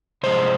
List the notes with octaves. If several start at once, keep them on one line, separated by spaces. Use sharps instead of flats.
C3 F3 G#3 C5